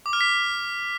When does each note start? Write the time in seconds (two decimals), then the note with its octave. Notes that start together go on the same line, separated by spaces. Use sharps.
0.06 D6
0.13 F6
0.21 B6